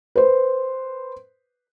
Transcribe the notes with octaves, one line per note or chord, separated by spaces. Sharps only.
B4 C5